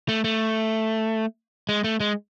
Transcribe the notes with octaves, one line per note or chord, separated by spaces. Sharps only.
A3
A3
G#3
A3
G#3